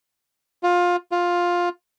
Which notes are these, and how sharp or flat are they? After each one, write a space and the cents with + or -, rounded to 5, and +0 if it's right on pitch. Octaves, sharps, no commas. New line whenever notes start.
F4 +20
F4 +10